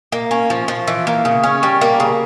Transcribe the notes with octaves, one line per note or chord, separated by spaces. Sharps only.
A#3
C#4
F3
F3
E3
A#3
C#3
C#4
G3
A#3
C#3